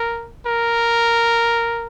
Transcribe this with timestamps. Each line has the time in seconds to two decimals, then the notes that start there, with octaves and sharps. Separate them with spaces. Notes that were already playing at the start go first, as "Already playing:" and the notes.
Already playing: A#4
0.46 A#4